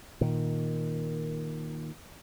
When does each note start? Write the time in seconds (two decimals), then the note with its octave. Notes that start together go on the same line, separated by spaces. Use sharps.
0.21 A#2 D#3